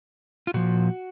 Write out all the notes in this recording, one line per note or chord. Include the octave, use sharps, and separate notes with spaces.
F4
A#2 F3 F#4